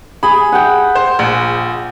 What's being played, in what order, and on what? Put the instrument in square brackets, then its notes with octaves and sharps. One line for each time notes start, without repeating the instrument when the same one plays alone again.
[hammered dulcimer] G#4 [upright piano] B5
[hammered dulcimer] F#5 G5
[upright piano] C5
A#1